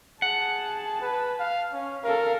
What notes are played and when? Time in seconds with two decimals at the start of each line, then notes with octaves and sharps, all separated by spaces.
0.22 G#4 F#5 A5
1.01 B4
1.39 F5
1.73 C#4
2.04 A4 A#4 F5